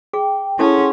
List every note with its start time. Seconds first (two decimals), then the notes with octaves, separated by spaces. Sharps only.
0.13 G#4 G5
0.59 C#4 E4 G#4 A4 F#5 A5 C6